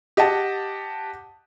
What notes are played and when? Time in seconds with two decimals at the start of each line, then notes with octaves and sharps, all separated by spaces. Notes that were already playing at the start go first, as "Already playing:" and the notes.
0.17 G4 D#5 F#5 A5